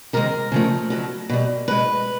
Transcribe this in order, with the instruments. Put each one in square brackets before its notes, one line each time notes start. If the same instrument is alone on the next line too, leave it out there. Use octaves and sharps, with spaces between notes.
[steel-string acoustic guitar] C3 D#3 G#3 A#4
C#3 F3 A3
B2 F#3 A3
B2 G3
B2 G#3 B4